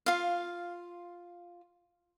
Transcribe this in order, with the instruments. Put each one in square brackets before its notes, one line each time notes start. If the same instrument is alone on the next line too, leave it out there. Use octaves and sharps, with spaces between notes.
[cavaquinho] F4 F5